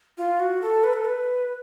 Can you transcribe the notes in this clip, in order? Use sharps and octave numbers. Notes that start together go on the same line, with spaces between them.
F4
F#4
A4
B4
A4
B4